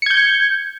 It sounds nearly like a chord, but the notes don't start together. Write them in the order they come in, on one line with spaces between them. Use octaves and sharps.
C#7 G#6 G6